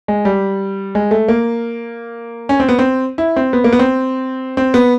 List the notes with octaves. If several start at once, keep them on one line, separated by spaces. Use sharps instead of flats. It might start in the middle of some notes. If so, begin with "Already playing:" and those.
G#3
G3
G#3
A3
A#3
C#4
C4
B3
C4
E4
C4
B3
A#3
B3
C4
C4
B3